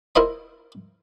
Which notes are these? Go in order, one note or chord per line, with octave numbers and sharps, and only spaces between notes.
E4 A#4 C5 D#5 B5